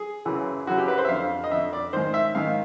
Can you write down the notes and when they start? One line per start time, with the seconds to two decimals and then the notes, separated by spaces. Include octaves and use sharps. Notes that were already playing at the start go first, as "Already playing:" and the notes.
Already playing: G#4
0.25 F#2 C#3 E3
0.67 F#2 C#3 E3 F#4
0.78 G4
0.88 B4
0.98 C5
1.05 E5
1.09 F2 D3 F5
1.44 D#5
1.51 F2 D3 E5
1.73 D5
1.93 G#2 D#3 C5
2.14 E5
2.35 G#2 D#3 F5